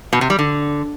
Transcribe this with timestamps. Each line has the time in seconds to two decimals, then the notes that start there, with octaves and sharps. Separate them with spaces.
0.13 B2
0.21 C3
0.30 G3
0.39 D3